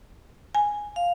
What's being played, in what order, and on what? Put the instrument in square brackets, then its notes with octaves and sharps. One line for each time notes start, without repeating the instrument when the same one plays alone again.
[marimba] G#5
[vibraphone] F5